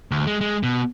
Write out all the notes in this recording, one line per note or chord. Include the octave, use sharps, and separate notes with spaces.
D2
G#3
G#3
B2